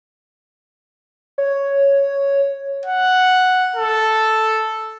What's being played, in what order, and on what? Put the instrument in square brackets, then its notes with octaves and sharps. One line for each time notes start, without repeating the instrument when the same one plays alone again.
[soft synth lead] C#5
[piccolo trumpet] F#5
A4